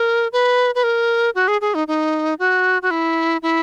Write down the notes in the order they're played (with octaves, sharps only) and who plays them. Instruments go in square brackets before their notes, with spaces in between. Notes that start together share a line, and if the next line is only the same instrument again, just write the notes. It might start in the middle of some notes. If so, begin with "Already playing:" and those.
Already playing: [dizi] A#4
B4
B4
A#4
F#4
G#4
G#4
D#4
D#4
F#4
F#4
E4
E4